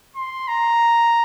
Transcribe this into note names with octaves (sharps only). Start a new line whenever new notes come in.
C6
A#5